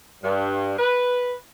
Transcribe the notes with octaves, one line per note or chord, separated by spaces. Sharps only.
G2
B4